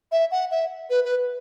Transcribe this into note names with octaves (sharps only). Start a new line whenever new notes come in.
E5
F#5
E5
B4
B4